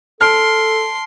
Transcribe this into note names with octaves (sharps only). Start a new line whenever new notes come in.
A4 A5 C6 F6 D7